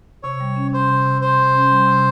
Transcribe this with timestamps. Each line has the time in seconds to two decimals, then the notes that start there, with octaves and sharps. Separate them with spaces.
0.23 C3 C#5
0.40 G3
0.56 C#4
0.73 C3 C5
0.89 C3
1.06 C3
1.22 C3 C5
1.39 C3
1.55 C#4
1.71 G3
1.88 C3